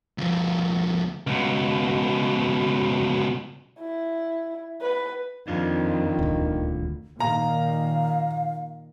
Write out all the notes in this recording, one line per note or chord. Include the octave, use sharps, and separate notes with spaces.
D2 F3
C#2 B2
E4
B4
F2 D#3 D4 F4
D#1 D2
A#2 D#3 F5 A#5